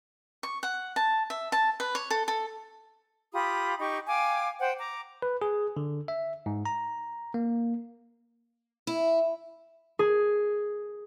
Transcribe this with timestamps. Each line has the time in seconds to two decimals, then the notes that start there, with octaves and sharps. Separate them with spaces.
0.43 C#6
0.63 F#5
0.96 A5
1.30 E5
1.52 A5
1.80 B4
1.95 C#5
2.10 A4
2.28 A4
3.33 F4 G4 B5 D#6
3.80 D#4 G4 C#6
4.07 F5 G5 G#5 D6
4.60 C5 F#5 G5
4.78 A#5 D6
5.22 B4
5.42 G#4
5.77 D3
6.08 E5
6.46 G#2
6.66 A#5
7.34 A#3
8.87 E4
9.99 G#4